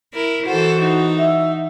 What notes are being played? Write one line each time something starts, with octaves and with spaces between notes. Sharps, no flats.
E4 A#4
E3 F#4 A4 C5
D#4
E5